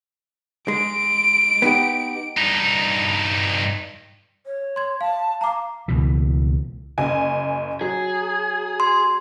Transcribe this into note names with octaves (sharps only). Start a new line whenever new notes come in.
G#3 D7
B3 D#4 G4
G2 D#4
C#5
C6 G#6
F5 A5
F5 A#5 D6
C#2 B2 E3
F#1 G#5
F#3 G#4
C6